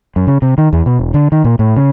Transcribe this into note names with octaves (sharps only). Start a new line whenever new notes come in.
F#2
C#3
C3
D#3
E2
B2
E1
D3
D#3
A#2
A2
C#3